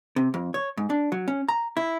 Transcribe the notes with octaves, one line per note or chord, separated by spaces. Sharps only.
C3
F2
C#5
G#2
D4
F#3
C#4
A#5
E4